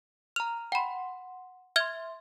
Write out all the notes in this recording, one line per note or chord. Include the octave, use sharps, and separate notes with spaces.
A#5 F6 F7
F#5 G5 B5 C6
E5 C6 F6 G#6 G7